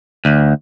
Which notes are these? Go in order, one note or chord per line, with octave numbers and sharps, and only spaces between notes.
D2